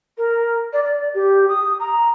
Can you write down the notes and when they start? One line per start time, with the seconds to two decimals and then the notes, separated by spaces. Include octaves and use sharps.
0.17 A#4
0.73 D5
0.84 D5
1.14 G4
1.48 D#6
1.79 A#5